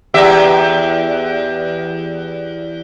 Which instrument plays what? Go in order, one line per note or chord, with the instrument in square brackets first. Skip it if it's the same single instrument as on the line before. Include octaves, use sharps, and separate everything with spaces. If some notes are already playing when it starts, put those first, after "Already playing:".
[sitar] E2 G4 E5